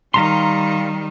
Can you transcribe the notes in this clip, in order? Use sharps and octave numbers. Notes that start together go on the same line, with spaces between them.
D#3 G3 F5 A#5 C6